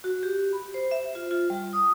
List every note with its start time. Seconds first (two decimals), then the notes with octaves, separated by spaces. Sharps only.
0.04 F#4
0.23 G4
0.53 B5
0.74 C5
0.91 E5
1.15 F4
1.31 F4
1.50 G3
1.73 D#6